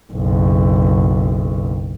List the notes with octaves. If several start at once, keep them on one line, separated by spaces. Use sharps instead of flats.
F#1 B1